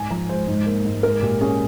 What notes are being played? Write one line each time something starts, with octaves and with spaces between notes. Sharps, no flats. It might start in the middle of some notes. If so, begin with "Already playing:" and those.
Already playing: G#2 G#5
F3 A#5
G#3 C5
G#2
A#3
G#2
G#3 A#4
A#2 G4
C#4 G#4